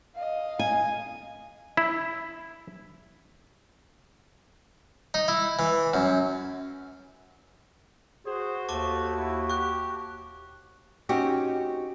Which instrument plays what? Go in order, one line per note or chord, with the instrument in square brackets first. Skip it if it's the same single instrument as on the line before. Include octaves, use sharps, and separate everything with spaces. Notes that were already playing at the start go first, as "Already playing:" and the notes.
[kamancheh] D#5 F5
[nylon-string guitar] G#5
[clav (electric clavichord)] E4
[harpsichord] D#4
E4
E3
F#2
[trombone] F#4 [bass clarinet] G#4 [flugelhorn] C5
[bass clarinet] D#2 [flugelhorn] A3 [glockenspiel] A5 C#6 D6
[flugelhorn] E4
[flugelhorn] G4 [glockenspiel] C#6 F#6
[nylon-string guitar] C4 C#4 D#4 F#4 G4